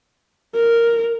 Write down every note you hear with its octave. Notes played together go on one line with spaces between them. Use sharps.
A#4